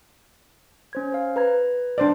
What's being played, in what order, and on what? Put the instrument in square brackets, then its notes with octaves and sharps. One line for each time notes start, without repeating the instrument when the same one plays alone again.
[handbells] C#4 C5 G#6
C5 F5
B4 A#5 G#6
[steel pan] D4 C5 D5